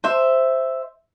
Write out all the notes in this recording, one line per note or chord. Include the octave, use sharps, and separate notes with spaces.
C5 E5